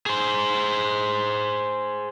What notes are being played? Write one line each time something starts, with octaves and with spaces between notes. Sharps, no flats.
G#4 C5